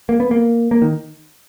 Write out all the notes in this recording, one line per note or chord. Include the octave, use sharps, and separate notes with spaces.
A#3
B3
A#3
A#3
D#3